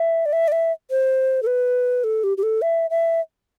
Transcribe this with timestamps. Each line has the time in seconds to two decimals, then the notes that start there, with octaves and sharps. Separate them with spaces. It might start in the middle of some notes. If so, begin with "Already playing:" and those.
Already playing: E5
0.26 D5
0.33 E5
0.48 D5
0.52 E5
0.91 C5
1.43 A4
1.47 B4
2.04 A4
2.24 G4
2.37 G4
2.43 A4
2.62 E5
2.90 E5